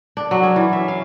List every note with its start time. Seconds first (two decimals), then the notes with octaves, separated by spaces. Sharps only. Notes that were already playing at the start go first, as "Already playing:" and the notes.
0.17 D4
0.31 F#3
0.43 C#4
0.56 E3
0.73 E5
0.88 F5